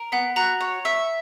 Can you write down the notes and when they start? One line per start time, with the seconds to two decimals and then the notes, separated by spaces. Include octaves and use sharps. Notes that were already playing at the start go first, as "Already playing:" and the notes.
Already playing: A#4
0.12 B3 F#5
0.36 F#4 F#5 A#5
0.61 C#5
0.85 E5